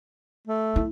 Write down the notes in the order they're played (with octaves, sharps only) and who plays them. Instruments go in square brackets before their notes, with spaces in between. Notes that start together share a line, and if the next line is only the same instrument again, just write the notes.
[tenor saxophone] A3
[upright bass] E4